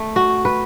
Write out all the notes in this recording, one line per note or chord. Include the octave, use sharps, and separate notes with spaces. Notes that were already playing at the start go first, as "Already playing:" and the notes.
Already playing: A3
F#4
B4